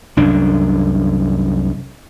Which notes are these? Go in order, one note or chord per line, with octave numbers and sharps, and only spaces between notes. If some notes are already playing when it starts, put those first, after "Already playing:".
C2 F#2 D4